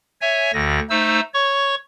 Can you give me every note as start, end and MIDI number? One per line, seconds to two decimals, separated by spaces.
0.21 0.52 73
0.21 0.52 76
0.21 0.52 80
0.54 0.80 38
0.54 0.80 50
0.54 0.80 94
0.90 1.21 57
0.90 1.21 63
0.90 1.21 72
0.90 1.21 88
1.34 1.75 73
1.34 1.75 85